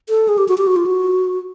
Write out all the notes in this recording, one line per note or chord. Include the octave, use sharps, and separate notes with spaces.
A4
G#4
G4
F#4
G4
F#4
F4
F#4